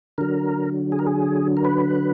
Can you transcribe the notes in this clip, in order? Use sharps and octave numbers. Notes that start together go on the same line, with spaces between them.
D3 F#3 A#4
G#4
A#4
G#4
A#4
B4